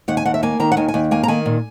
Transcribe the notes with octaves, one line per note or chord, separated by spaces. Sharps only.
D#2 F#5
G#5
D#2 F#5
E5
A#3 G#5
D#3 A#5
F#5
D#2 G#5
G#5
D#2
A#3 G#5
A#5
D#3 G#5
A#2